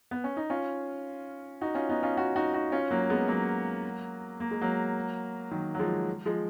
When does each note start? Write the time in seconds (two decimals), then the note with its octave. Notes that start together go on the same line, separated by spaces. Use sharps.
0.11 B3
0.24 C#4
0.37 D#4
0.50 C#4 F4
1.61 D#4 F#4
1.75 C#4 F4
1.89 B3 D#4
2.03 C#4 F4
2.17 D#4 F#4
2.36 D#4 F#4
2.54 D#4 F#4
2.72 C#4 F4
2.91 F#3 A#3
3.10 G#3 B3
3.28 F#3 A#3
4.40 A#3
4.51 G#3
4.61 F#3 A#3
5.51 D#3 F#3
5.75 F#3
5.79 F3 G#3
6.25 F3 G#3